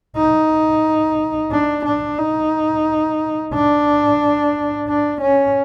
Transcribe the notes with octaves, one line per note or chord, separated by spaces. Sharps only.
D#4
D4
D4
D#4
D4
D4
C#4